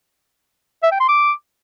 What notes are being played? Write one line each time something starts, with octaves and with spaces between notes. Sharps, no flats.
E5
G5
C6
D6